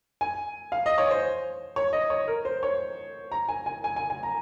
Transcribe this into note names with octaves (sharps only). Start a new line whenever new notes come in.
G#5
F5
D#5
C#5
C5
C#5
D#5
C#5
A#4
C5
C#5
A#5
G#5
G#5
G#5
G#5
G#5
A#5